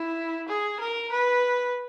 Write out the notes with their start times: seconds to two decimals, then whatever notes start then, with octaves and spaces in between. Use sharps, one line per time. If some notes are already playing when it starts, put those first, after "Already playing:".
Already playing: E4
0.48 G#4
0.80 A#4
1.12 B4